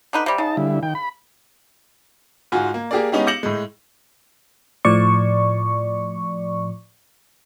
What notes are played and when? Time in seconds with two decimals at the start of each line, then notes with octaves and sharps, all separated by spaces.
0.13 D3 D#4 B4
0.26 C3 G3
0.38 C#3 D#4 A5
0.57 D3 G3 E4
0.83 D#3 G5
0.95 B5
2.52 G#2 F4 F#4 G#5
2.74 A#3
2.91 A#3 G4 G#4 A#4 D5
3.12 G#3 B3 C#4 D#4 G4 G#4
3.27 D6 G6 A#6 C#7 E7 F#7
3.43 A2 G#3
4.85 A2 F3 D5 C#6